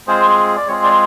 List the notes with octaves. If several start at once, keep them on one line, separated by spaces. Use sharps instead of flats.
G#3 C4 F4 G#4 C5
D5
G#3 C4 F4 G#4 C#5
D5